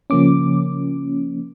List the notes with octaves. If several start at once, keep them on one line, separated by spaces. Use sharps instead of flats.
C#3 F3 A#3 C#4 D6